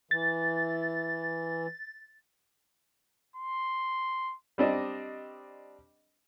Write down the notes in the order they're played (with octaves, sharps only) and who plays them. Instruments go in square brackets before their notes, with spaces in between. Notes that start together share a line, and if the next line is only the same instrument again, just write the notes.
[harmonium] E3 [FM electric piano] A6
[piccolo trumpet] C6
[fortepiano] G3 C4 D4 D#5